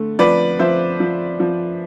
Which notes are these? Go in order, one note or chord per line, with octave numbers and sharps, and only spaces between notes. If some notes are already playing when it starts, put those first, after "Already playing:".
Already playing: D3 A3
F3 B4 D5
F3 C5 E5
F3
F3